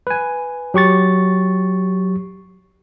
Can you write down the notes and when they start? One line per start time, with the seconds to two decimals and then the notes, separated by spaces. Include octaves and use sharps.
0.07 B4 G#5
0.74 F#3 G4 C#6 A6